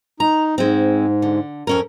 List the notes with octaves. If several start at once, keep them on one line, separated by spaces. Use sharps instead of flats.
D#4 A#5
G#2 G#3 C4
D3
F2 C#4 A#4